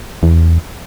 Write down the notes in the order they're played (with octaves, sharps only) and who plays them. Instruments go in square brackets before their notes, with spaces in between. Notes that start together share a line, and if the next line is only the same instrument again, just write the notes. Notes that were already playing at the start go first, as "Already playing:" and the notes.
[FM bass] E2